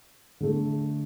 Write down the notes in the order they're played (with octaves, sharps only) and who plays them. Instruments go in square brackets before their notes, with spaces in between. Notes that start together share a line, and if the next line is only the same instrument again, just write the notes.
[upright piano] D3 A3